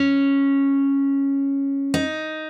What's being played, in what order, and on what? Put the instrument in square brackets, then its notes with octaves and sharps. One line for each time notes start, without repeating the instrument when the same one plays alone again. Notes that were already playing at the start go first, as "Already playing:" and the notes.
Already playing: [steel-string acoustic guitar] C#4
D#4